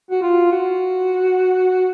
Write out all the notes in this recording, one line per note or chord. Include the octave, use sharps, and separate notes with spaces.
F#4
F4
F#4